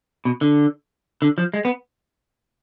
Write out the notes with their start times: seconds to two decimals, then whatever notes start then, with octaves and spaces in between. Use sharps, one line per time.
0.25 B2
0.41 D3
1.22 D3
1.38 F3
1.54 G#3
1.65 B3